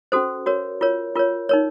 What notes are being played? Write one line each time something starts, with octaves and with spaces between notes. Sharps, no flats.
C#4 F#4 A4 C5
F#4 A#4 C#5
F4 A#4 C#5
F4 A#4 C#5
D#4 A#4 C#5